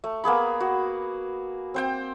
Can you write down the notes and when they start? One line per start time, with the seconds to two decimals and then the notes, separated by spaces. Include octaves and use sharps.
0.04 A3
0.24 A#3 B3 G#4 B5
0.60 F#4
1.74 C4 C5 G5